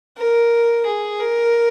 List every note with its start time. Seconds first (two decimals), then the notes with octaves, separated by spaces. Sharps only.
0.18 A#4
0.86 G#4
1.20 A#4